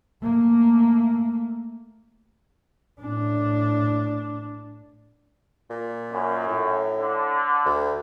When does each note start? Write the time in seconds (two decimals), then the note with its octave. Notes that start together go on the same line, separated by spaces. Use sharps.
0.22 A3 A#3
3.02 A2 D4
5.70 A#2
6.12 F#2
6.47 A2
6.99 D3
7.66 D2